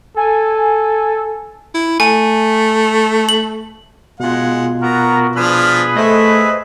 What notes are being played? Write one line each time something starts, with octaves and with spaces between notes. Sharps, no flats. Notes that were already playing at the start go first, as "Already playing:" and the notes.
A4 G#5
E4
A3 G#5
F#7
B2 G#3 F4 F#5
B3 F#4 A#4 A#5
F3 D4 G#4 B4 B5 F6
A3 C5 D#5 E5